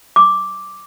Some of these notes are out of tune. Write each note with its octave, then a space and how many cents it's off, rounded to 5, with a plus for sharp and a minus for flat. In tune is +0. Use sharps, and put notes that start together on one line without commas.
D6 +0